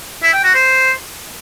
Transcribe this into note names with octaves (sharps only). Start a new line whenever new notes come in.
E4
G5
F#4
C5